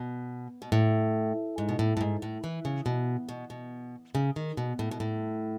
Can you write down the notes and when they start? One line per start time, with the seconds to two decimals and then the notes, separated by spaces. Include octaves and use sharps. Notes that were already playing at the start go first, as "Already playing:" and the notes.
Already playing: B2
0.62 B2
0.72 A2
1.58 G#2
1.69 B2
1.79 A2
1.97 A2
2.01 G#2
2.22 A2
2.44 E3
2.65 C#3
2.86 B2
3.29 B2
3.50 B2
4.15 C#3
4.36 D#3
4.57 B2
4.79 A2
4.91 B2
5.00 A2